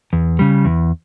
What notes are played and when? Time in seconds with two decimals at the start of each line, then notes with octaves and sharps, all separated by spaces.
0.13 E2
0.39 C#3 G3
0.65 E2